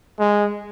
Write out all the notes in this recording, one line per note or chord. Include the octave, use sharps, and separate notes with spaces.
G#3